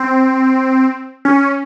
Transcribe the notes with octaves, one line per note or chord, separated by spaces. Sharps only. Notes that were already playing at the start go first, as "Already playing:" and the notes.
Already playing: C4
C#4